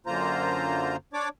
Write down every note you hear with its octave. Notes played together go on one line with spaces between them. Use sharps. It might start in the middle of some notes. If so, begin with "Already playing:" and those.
F#2 D3 A#3 F4 C5 A#5
D4 C#5 D5 D6